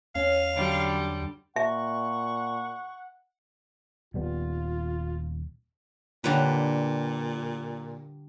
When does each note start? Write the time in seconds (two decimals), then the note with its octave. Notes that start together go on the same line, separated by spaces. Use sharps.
0.15 E2 C#4 F5
0.54 D3 F#3 G3
1.56 A#2 E5 F#5 C#6
4.14 D#1 G3 B3 F4
6.24 A#2 D3 G3 B4